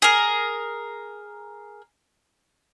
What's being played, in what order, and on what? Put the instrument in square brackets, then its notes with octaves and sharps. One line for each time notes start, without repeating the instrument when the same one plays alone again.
[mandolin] G#4 A#4